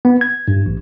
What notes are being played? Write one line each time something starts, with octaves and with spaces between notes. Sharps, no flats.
B3
G#6
G2
A1